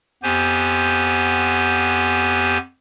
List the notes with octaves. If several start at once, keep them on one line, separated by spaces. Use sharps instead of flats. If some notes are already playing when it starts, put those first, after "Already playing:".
F2 B3 G4 C5 G#5